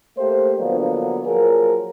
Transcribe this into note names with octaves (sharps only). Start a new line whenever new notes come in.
A3 A#3 G4 C5
D3 F3 F#3 A#3 B3 D4
F3 F#3 A#3 G#4 A#4